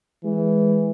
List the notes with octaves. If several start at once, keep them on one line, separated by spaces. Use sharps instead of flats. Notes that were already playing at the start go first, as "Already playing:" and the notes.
E3 G#3